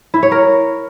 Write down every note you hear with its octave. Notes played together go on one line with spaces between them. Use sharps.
E4
C#5
A#4